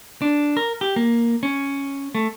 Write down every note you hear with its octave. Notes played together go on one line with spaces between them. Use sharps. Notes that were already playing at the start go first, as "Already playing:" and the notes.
D4
A#4
G4
A#3
C#4
A3